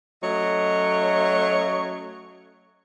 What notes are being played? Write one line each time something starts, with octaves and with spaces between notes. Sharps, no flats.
F#3 A3 C#4 C#5 D#5